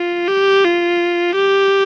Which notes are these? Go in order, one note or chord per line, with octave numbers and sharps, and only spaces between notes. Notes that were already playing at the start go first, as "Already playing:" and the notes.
Already playing: F4
G4
F4
G4